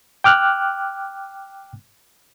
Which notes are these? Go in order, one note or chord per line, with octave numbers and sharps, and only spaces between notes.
G5 D6 F6 F#6